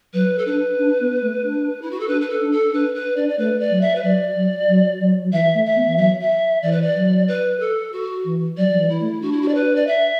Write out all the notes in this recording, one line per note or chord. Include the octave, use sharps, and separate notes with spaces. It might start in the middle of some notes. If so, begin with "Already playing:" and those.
F#3 B4
A4
D4 B4
D4
B3
A3
D4
E4
F#4
A4
D4 B4
B4
A4
D4
A4
D4 B4
B4
D4 D5
D5
A3 B4
D5
F#3
E5
B4
F#3 D5
F#3
F#3
F#3
F#3
E3 E5
A3
E5
B3
E3
F#3 E5
E5
E3 D5
B4
D5
F#3
B4
A4
F#4
E3
F#3 D5
F#3
E3
E4
A3
D4 F#4
E4
F#4
D5
B4
D5
E5